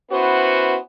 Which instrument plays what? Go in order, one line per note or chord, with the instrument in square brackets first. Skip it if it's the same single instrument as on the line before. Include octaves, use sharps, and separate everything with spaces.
[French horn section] B3 C#4 E4 F#4 B4 C5